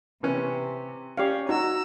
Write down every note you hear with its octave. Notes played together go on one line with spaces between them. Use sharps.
C3 E3 B3 C#4
C#4 G4 C#5 D5 F5 D6
D#4 F#4 A#5 E6